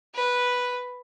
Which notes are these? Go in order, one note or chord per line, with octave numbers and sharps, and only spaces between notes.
B4